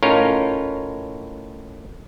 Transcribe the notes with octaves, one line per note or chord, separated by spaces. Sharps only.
A2 C#4 D#4 F4 A#4 C#5